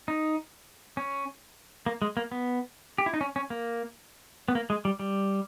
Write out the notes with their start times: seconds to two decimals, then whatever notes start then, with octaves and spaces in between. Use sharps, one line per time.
0.08 D#4
0.97 C#4
1.86 A#3
2.02 G#3
2.17 A#3
2.32 B3
2.98 G4
3.06 E4
3.14 D#4
3.21 C#4
3.36 C#4
3.50 A#3
4.48 B3
4.55 A#3
4.70 G#3
4.85 G3
5.00 G3